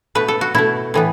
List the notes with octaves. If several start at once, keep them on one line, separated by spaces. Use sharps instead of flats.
B2 A3 B4
A4
F#4
B2 A3 E4
A2 E3 B3